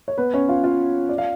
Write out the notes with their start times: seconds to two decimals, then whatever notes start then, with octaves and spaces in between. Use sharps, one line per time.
0.08 C#5
0.18 B3 B4
0.34 C#4 C#5
0.49 F4 F5
0.64 F4 F5
1.09 D5
1.18 F5